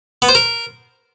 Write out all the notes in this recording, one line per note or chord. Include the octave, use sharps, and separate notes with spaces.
B3
C5
A#4